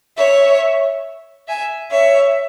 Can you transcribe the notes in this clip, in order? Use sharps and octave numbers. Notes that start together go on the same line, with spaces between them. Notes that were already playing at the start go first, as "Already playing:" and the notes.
C#5 E5
E5 G#5
C#5 E5